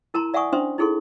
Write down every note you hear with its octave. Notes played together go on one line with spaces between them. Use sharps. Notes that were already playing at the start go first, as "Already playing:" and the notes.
E4 A#4 A5 A#5 C6
D5 E5 F#5 G#5 C#6 D#6
C#4 D4 C5 E5 C6 D#6
D#4 E4 G#4 A4 C6